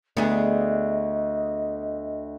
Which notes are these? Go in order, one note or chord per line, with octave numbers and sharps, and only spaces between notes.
D2 B3 G#4 D#5